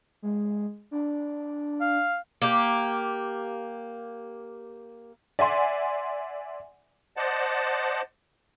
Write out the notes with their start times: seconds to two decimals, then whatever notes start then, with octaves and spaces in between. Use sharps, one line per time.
0.22 G#3
0.91 D4
1.81 F5
2.42 A#3 G4
5.39 D5 E5 F#5 G#5 C6
7.17 C5 D5 D#5 F#5 A5